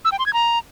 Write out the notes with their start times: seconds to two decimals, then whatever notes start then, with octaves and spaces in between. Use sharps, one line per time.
0.05 E6
0.12 G5
0.19 C6
0.26 G#6
0.33 A#5